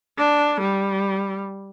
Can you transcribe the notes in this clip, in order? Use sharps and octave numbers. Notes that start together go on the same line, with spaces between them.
D4
G3